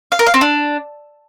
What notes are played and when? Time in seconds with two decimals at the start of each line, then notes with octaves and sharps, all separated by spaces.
0.12 F5
0.19 A#4
0.27 F5
0.34 C4
0.41 D4